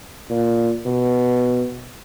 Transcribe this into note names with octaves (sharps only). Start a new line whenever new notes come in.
A#2
B2